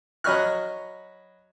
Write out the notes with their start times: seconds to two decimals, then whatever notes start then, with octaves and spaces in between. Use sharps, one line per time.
0.24 F#3 D#5 B5 C#6 F6 F#6